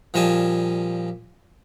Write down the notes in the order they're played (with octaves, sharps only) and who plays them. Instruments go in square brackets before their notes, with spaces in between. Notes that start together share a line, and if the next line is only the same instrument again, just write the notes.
[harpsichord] A#2 F3 G3 D#5 G#5 A5